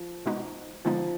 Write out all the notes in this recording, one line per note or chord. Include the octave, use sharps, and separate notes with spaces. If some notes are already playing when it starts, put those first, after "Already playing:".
Already playing: F3
B2 G#3 B3 D#4 F#4
D3 F3 G#3 B3 D#4